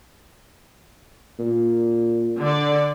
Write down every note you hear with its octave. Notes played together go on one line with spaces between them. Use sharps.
A#2
D3 D5